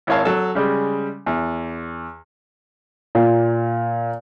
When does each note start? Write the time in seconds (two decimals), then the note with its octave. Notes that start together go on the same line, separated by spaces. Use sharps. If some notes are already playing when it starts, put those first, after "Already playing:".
0.07 G#1 E4 A#4 C#5 F5 A5
0.25 F#3 A4
0.55 C#3 G3 G#3
1.26 E2
3.15 A#2